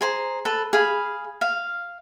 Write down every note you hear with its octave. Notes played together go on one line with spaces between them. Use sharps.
G#4 C5 A#5
A4 B4
G#4 F5 B5
F5